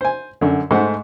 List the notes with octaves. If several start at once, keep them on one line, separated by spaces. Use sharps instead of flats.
C5 G#5
F#2 D3
G#2 A3 C5 F#5